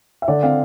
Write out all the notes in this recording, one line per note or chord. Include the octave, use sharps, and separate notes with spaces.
E5
D3 D5
C4 F5